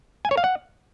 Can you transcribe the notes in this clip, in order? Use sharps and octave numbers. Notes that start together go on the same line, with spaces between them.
G#5
C#5
F5
F#5